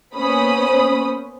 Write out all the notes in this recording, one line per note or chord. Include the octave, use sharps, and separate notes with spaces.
A#3 B3 C#4 C5 B5 D#6